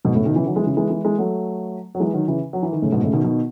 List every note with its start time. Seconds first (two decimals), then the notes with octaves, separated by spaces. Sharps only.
0.05 G#2 B2
0.15 A2 C#3
0.25 B2 D#3
0.36 C#3 E3
0.46 D#3 F#3
0.56 E3 G#3
0.66 C#3 E3
0.77 E3 G#3
0.90 E3 G#3
1.05 E3 G#3
1.18 F#3 A3
1.95 F#3
2.00 E3 G#3
2.13 D#3 F#3
2.28 C#3 E3
2.53 F#3
2.63 E3
2.72 D#3
2.82 A2 C#3
2.92 G#2 B2
3.03 A2 C#3
3.13 B2 D#3
3.24 B2 D#3